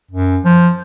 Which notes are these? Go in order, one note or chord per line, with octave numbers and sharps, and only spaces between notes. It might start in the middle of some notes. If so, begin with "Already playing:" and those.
F#2
F3